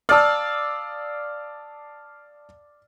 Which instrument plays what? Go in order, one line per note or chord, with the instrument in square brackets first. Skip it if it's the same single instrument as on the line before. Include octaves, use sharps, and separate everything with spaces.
[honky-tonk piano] D5 [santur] F5 E6 [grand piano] A5 D#6